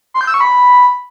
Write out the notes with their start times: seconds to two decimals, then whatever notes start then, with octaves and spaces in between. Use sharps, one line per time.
0.14 C6
0.21 G6
0.27 E6
0.34 C#6
0.41 B5